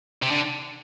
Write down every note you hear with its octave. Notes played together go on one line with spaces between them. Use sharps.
C3
D3